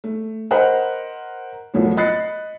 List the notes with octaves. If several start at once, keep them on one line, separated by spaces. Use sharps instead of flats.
A3
A#4 C5 D#5 F#5 B5 F#6
C2 A2 F3 F#3 A3 B3
D#5 B5 F#6 A6 C7 C#7